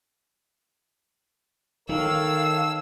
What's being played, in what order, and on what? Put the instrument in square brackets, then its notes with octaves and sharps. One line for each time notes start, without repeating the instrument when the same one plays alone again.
[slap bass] D#3 [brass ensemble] D#4 A4 C#5 [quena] F5 [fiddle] E6